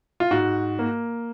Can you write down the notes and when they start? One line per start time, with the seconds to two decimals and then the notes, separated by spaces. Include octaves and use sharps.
0.20 F4
0.31 G#2 F#4
0.79 A#3